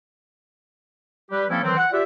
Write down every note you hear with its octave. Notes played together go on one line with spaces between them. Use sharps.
G3 G4 B4
F3 A#3 C4 C#4 E4 A4
D#3 E3 F#3 C4
F#5
F4 G4 D5 E5